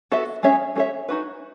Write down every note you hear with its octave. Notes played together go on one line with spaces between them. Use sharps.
B3 F#4 A4 E5
G#3 C#4 G#4 C#5 E5
G#3 C#4 G#4 C#5 E5
D#4 F#4 B4